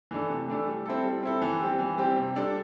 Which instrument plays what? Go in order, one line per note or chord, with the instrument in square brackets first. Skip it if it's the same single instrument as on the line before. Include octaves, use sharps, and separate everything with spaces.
[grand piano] E3 A3 D4 A4
C3
E3 A3 D4 A4
G3
C4 E4 A4
G3
C4 E4 A4
E3
G3 C4 G4
E3
G3 C4 G4
C3
G3 D4 A4